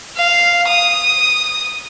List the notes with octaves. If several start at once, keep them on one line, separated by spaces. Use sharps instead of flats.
F5
D#6